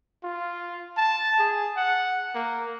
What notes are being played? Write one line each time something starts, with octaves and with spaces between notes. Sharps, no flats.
F4
A5
G#4
F#5
A#3